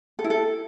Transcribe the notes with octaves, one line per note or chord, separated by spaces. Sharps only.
A4
E4
A4